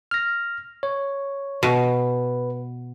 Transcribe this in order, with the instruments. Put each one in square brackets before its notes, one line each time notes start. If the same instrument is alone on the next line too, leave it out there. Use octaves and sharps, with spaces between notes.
[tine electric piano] F6 A#6
C#5
[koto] B2 [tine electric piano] B4